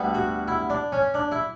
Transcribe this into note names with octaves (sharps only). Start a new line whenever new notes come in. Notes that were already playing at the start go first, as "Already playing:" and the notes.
Already playing: D2 D3 G3 B3
F#4
E4
D4
C#4
D4
E4